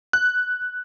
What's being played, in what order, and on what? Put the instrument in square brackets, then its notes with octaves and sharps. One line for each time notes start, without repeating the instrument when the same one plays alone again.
[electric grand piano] F#6